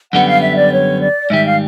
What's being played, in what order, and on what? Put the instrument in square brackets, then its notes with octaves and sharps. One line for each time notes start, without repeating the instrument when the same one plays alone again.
[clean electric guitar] F#2 D3 G3 B3 [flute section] F#5
[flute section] F5
E5
D5
C#5
D5
[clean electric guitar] G#2 D#3 G3 [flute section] E5
[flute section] F5